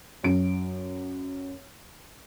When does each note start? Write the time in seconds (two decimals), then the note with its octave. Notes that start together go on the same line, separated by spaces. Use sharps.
0.23 F#2 F#3 D7